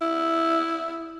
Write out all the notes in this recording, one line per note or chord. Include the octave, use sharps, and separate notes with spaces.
E4